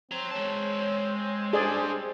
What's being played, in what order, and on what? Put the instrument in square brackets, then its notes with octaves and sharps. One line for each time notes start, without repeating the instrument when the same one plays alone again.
[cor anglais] C4 [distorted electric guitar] C#5 A#5
[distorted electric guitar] G#3 A5 [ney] C#5
[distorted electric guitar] D4 G4 [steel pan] G#4 D5 [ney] C5